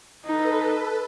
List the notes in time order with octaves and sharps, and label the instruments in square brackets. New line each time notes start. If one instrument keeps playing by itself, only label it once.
[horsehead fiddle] D#4 [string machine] A4 B4